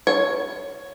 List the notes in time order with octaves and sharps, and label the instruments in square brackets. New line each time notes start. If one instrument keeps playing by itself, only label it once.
[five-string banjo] C#5